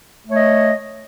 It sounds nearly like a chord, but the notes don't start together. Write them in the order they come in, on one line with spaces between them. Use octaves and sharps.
A3 C#5 D#5